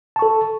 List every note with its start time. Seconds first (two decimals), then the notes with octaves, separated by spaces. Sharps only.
0.16 A5
0.19 C#6
0.22 A4